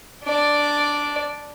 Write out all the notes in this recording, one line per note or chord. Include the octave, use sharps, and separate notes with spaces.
D4 D5